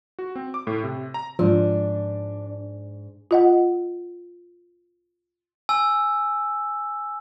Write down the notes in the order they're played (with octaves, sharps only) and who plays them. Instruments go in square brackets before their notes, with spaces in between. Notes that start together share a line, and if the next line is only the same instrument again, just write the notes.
[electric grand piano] F#4
C4
D6
A2
C3
A#5
[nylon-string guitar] G#2 [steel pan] F3 [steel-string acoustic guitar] D4
[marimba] F4 D#5 F#5
[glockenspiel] G#5 E6